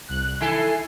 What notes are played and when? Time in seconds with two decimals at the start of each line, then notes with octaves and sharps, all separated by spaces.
0.08 C2 F#6
0.40 D#3 E4 A4 G#5 C7